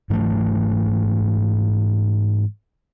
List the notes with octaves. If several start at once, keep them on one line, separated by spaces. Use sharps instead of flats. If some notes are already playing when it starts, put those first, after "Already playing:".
G#2 E3 F#3 A3